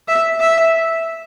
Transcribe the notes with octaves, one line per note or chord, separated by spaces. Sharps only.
E5
E5